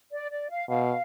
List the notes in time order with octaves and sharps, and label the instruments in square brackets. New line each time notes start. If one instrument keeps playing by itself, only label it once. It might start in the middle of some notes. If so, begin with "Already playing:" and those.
[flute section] D5
D5
F5
[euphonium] B2 [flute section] F5